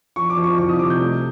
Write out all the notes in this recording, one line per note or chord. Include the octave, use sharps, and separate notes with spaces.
F3 C#6
D6
F3
C#6
C2 C#6
D#6
C3 D6
G6
A3